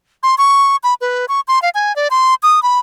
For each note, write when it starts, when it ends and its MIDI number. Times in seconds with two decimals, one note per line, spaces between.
0.23 0.35 84
0.38 0.76 85
0.83 0.94 83
1.01 1.25 71
1.28 1.40 85
1.48 1.62 84
1.62 1.70 77
1.75 1.95 80
1.96 2.08 74
2.11 2.35 84
2.43 2.63 87
2.63 2.79 83